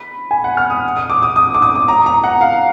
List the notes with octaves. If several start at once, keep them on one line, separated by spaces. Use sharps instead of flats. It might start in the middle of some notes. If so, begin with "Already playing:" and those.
Already playing: B5
G#5
F#5
F6
D#6
D#6
D6
D#6
D#6
D6
D#6
D6
A#5
A#5
F#5
F5